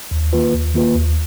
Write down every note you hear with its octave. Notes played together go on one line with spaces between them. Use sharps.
D#2
D#3 A#3 F4 B4
D#2
D#3 A#3 F4 B4
D#2